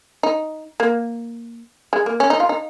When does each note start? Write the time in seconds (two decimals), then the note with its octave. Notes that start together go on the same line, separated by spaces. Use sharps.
0.23 D#4
0.80 A#3
1.93 G#3
2.06 A#3
2.20 C#4
2.30 D#4
2.40 F4
2.49 D#4